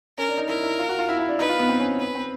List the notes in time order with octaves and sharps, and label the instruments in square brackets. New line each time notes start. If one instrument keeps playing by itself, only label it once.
[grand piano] C#4 [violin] A#4
[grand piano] D4
D#4
[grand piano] E4 [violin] A#4
[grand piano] E4
F4
F#4
F4
E4
E4
D4
[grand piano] D#4 [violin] B4
[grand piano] F4
B3
C4
C#4
[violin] B4
[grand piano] C4